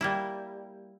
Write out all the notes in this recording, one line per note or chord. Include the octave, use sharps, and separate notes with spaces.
G3 A#3 E4